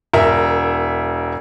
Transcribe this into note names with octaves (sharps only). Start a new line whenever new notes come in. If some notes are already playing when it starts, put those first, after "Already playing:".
E1 A#4 E5